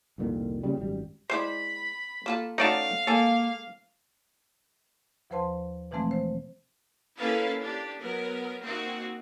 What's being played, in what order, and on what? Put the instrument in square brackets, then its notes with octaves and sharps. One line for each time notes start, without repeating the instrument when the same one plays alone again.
[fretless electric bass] C2 F2 A#2 D#3
A#2 C#3 G3
G#1 F#2 G3
[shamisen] G#3 E4 D5 [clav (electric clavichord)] C5 [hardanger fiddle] B5
[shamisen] A#3 F4 A4
[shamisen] A3 C#4 F#4 [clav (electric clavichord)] D#4 D5 A5 [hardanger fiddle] F5
[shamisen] G#3 A#4 G#5 [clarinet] A#3 [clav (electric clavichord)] A4
[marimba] D#2 F3 B4 C5 A5 C6
B2 E3 F3 G#3 A3 C4
C5
[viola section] A#3 C#4 E4 A4 B4 F5
D4 G4
F#3 B3 A#4
A#3 C4 D#4 F#4